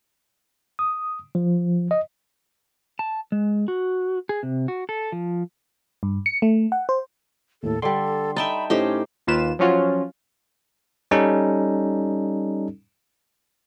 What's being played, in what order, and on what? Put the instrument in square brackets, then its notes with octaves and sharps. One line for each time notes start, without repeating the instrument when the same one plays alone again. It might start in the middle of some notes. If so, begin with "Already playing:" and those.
[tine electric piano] D#6
F3
D#5
[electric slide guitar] A5
G#3
F#4
G#4
C3
F#4
A4
F3
[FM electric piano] G2
C#7
A3
F#5
C5
[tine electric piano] D#2 A2 [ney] A4
[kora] D3 G3 [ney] A4 [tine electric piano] C6
[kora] D#4 [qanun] E5 G5 A5 [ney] B5
[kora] A2 [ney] C#4 [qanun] D#4 G4 C5
[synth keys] D#2 A#3 F4 B4 E7
F3 F#3 C#4 F4 F#4
[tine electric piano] G3 C#4 D#4 A4